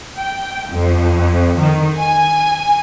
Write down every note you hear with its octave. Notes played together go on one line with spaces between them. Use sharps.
G5
F2
D#3
G#5